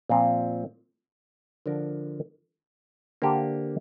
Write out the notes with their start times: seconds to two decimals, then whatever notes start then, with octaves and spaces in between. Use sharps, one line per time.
0.09 A#2 F3 C4
1.66 D3 F3 D4 A#4
3.22 D3 A#3 D4 G4 C5